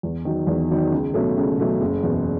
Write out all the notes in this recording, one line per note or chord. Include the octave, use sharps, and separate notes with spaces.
E2
D#3 F#3
E2
D#3 F#3
C#2
B2 F#3 A3 C#4
C#2
B2 F#3 A3 C#4
F#1
E2 B2